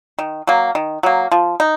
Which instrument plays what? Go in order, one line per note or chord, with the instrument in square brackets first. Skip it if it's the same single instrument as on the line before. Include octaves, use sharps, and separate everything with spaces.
[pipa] D#3
F#3 A#3
D#3
F#3 A#3
F3
D#4